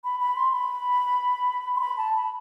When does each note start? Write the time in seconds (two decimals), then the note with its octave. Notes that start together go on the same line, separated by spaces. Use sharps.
0.04 B5
0.20 B5
0.36 C6
0.52 B5
1.76 C6
1.81 B5
1.98 A5
2.14 B5